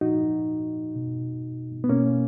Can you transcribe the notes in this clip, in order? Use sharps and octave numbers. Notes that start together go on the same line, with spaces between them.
A#2 F3 D#4 F#4
B2
B3
B2 A#3 C#4